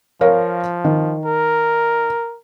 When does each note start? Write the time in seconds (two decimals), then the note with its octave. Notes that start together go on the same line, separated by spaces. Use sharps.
0.21 F3 A#4 C#5 F5
0.85 D#3
1.25 A#4